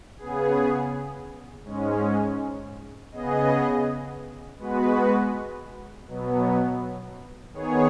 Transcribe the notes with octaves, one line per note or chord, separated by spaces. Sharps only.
C#3 B3 G#4
G#2 G#3 C#4
C#3 B3 G#4 D#5
G#3 B3 F#4 B4
B2 F#3 B3
D#3 B3 G#4 C#5